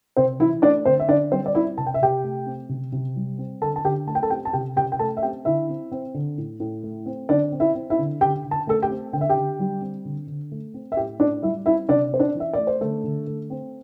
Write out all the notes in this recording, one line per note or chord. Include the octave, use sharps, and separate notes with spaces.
C3 C4 C5
E3 E4 E5
A3 D4 D5
D3 C4 C5
E5
D3 D4 D5
G3 C4 C5
D5
C4 E4 E5
C3 A5
G5
E5
C3 G4 G5
A3
C4
C3
C3
G3
C4
D3 A4 A5
A5
D3 G4 G5
A3 A5
G5
A4 A5
C4 G4 G5
A5
C3 G4 G5
C3 G4 G5
G5
A3 A4 A5
E5
C4 G4 G5
D3 E4 E5
C4
C4
D3
A2
A2
A3
C4
D3 D4 D5
C4
E4 E5
C4
E4 E5
D3
D3 G4 G5
D3
A5
A3 A4 A5
G4 G5
C4
D3 G5
E5
G4 G5
D3
G3
C4
D3
D3
A3
C4
E5
A2 G4 G5
A2 D4 D5
G3 E4 E5
C4 E4 E5
C3 D4 D5
C4 C5
D4 D5
E3
E5
A3 D5
C5
D3 A3 A4
D3
A3
C4